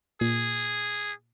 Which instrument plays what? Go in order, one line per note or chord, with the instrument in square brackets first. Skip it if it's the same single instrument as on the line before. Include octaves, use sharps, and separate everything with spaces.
[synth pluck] A#2 [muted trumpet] G#4